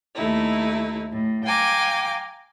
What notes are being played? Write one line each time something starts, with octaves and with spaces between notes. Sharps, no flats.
D#2 A3 D#4 E4
A2
F5 G5 G#5 A#5 D6